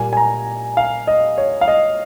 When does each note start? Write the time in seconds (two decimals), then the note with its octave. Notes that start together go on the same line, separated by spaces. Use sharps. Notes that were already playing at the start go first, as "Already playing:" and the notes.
Already playing: A#2 G3 A#3 G#5
0.13 G#5
0.17 A#5
0.77 F5
1.07 D#5
1.38 C#5
1.61 F5
1.68 D#5